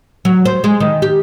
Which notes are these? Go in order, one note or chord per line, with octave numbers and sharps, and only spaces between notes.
F#3
C5
G#3
D#3
G4